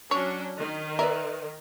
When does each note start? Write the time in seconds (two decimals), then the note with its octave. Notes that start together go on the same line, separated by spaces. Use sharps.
0.11 F#3 C#4 D4 C#5
0.59 D#3
0.99 A#4 B4 D5 E5